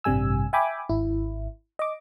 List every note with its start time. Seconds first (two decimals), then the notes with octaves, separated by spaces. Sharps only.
0.04 A1 G2 C3 G3 G#5 E6
0.53 E5 G5 G#5 B5 D6
0.89 G#1 E4
1.79 D#5 D6